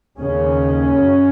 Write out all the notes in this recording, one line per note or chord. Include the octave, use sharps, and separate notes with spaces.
D#2 C#3 C#4
F#2